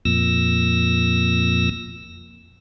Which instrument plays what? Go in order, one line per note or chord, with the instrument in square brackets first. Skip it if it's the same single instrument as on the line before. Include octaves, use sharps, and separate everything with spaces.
[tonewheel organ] F2 A#2 E6 A#6